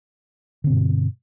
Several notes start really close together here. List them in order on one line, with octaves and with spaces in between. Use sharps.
D3 C4 B2 G2